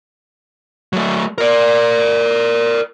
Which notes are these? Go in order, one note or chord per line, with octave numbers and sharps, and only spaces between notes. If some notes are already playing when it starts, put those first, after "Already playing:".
F#3 A3
A#4 D5